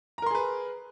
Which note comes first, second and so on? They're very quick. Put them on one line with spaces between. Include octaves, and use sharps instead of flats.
A#5 A#4 C6 G#4 B4